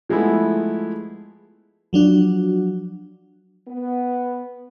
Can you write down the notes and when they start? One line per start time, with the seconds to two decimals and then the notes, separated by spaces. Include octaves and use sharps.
0.09 F3 G#3 A3 B3 E4
1.93 F3 F#3 D4 F#4
3.68 B3